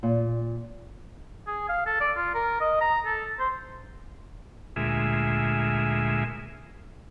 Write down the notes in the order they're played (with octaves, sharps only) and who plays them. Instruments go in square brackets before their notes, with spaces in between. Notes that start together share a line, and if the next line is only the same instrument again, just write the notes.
[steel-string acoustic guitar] A#2
[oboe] G#4
F5
A4
D5
F4
A#4
D#5
A#5
A4
C5
[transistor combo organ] D2 A#2 G#3 F4 G#4 E5